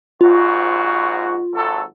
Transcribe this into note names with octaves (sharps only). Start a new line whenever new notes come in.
A#1 G#2 F4 F#4
G#1 F#3 A4